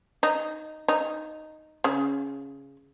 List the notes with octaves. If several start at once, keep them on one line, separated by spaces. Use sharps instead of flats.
D#4
D#4
C#3